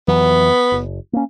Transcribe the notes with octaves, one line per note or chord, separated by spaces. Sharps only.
F2 E3 F#3 B3
F#1
A#3 C#4